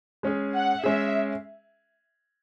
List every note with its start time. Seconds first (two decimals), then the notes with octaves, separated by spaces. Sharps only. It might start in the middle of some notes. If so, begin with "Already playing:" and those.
0.23 G#3 C#4 G#4
0.53 F#5
0.84 G#3 C#4 G#4 E5